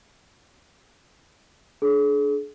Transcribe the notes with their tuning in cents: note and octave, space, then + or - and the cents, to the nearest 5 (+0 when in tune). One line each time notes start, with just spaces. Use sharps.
D4 +0 G#4 +40